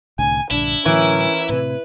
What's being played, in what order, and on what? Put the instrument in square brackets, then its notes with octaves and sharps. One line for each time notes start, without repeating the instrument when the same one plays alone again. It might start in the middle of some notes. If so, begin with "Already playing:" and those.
[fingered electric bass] C2 A2 D3 [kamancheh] G#5
[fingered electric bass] A#1 G2 D3 [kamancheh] D4 [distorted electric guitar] E4
[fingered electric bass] A2 D3 F#3 [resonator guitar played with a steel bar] E3 [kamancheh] C#4 A#4
[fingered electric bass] A2 C3 [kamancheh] B4